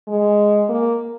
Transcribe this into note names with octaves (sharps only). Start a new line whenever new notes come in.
G#3
A#3